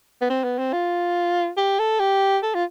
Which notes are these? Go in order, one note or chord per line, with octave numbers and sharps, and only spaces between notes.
B3
C4
B3
C4
F4
G4
A4
G4
A4
F4